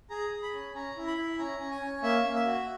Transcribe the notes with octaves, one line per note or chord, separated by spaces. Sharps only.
G#4 A#5
G#4
B5
C#4
C#4 A#5
E4
B5
E4
C#4 A#5
C#4
G#5
C#4
A#3 E5
A#3
E5
F#4